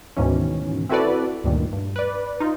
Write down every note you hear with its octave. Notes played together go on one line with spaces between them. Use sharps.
D2 G#2 B2 D#3 E3 C#4
C4 E4 F#4 A4 B4 D5
D2 G2 A#2 D#3
G2
B4 D5
D#4 F4